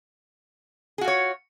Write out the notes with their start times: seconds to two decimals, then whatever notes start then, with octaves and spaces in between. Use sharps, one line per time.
0.98 G#4
1.01 F#4
1.04 F4
1.08 C#5